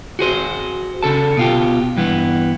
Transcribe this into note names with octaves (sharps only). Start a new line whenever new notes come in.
F#4 G#4 C5
C#3 A4 A5
B2 F4 G4
G2 E3 B3